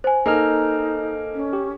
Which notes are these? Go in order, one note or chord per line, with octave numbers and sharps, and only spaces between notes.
C5 G#5
A#3 D#4 A4 D#5 F6
C#4
G4